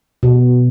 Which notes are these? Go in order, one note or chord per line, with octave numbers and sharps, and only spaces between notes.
B2